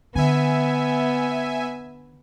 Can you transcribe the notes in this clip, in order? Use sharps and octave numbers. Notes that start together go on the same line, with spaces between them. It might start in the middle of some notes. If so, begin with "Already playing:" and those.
D3 B3 E5 G#5